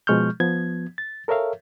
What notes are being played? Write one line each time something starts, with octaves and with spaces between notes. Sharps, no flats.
B2 F3 G#3 C#6 F6 G6
F3 B3 G#6
A6
A4 A#4 C#5 E5 F5